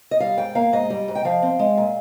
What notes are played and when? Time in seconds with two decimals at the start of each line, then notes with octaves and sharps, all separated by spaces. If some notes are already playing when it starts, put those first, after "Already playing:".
0.11 D#5
0.20 G3 F5
0.38 G#2 G5
0.55 A#3 F5
0.73 G#2 D#5
0.90 G3
1.08 G#2
1.15 G5
1.25 F3 F5
1.42 C4
1.59 G#3
1.77 A#2